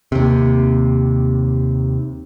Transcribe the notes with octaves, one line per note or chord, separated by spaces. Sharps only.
D#2 C3